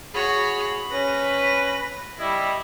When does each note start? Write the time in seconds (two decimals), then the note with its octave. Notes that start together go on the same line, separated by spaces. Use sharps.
0.15 F#4 G#4 C#5 B5
0.92 C#4 B4 A#6
2.19 G3 E4 D#5